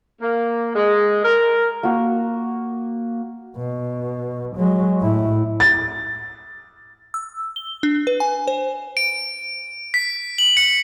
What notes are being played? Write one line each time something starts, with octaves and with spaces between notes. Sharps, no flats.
A#3
G#3
A#4
A#3 F#4
B2
F#3 G#3
A2 E4
A6
E6
G7
D4
B4
G#5
C5
D7
B6
F#7
C#7